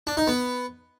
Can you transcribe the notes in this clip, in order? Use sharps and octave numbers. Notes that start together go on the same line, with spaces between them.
D4
D#4
B3